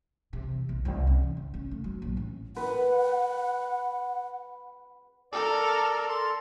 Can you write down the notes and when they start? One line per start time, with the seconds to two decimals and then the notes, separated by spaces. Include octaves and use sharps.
0.33 C3
0.51 E2
0.69 B1
0.85 C2
1.07 C#4
1.23 E3
1.37 C#3
1.54 C#4
1.71 A3
1.84 F#3
2.02 A#1
2.17 A1
2.56 B4 F#5
5.32 A4 A#4 D5
6.09 A4 A5 C6